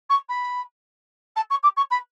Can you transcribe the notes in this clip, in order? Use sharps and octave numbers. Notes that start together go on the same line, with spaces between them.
C#6
B5
A5
C#6
D6
C#6
B5